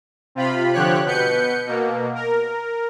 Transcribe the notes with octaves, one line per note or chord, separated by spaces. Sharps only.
C3 F4 B5
D3 F3 G4 C#5 F#6
B2 B4 G6 C#7
B2 A#3
A#4